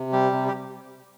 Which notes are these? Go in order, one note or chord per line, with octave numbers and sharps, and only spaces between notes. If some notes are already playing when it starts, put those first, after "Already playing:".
Already playing: C3
G3 G4
C3
G4